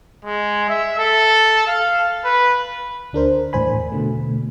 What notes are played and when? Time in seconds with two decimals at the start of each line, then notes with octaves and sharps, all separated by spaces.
0.25 G#3
0.70 E5
0.99 A4
1.67 F5
2.25 B4
3.13 D2 D4 A#4 C5
3.53 E2 A2 C5 G#5 B5
3.92 B2 D3 A3